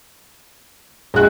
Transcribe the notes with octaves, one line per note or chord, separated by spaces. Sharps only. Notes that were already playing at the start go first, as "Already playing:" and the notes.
A#1 G#3 F#4 F#6